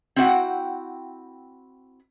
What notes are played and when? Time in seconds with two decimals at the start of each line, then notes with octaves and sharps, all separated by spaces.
0.16 C4 E4 F#4 D#5 F#5 G5